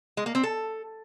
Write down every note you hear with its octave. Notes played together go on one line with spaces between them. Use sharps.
G#3
A#3
C4
A4